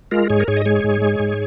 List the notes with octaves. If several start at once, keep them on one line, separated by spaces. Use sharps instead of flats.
G#3 F4 A#4
G#2 G#4 C#5
A#4
G#2 G#4 C#5
D#5
G#3 G#4 C#5
G#2
G#3
G#2